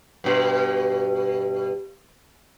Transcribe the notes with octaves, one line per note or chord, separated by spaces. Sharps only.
G2 B2